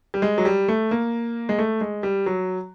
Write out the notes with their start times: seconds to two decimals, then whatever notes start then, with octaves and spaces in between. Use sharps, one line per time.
0.14 G3
0.22 G#3
0.38 F#3
0.45 G3
0.68 A3
0.91 A#3
1.49 G#3
1.59 A3
1.81 G#3
2.03 G3
2.26 F#3